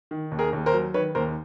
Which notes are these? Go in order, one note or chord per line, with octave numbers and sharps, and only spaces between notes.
D#3
D#2
G#4 A#4
D#2
A#4 C5
F#3
D#3 B4 C#5
D#2 A#4 C5